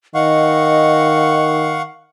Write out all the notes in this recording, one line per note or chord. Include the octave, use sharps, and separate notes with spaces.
D#3 D#5 F5 F#5 C#6